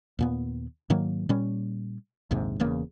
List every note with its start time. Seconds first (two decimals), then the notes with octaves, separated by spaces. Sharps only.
0.19 D#2 A#2 B3
0.90 G#2 D#3 F#3 A#3
1.29 A#2 G3 C#4
2.31 A#1 D#2 G#2 C3
2.60 E1 E2 C#3 A#3